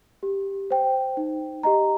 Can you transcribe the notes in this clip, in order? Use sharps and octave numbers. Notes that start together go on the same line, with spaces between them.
G4
C5 G5
D#4
G4 D#5 A#5